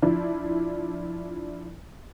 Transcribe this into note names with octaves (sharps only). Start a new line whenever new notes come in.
F3 D4 E4